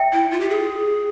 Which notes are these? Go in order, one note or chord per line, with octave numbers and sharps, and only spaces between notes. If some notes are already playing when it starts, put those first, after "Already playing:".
Already playing: E5 G5
E4
F4
G4
G#4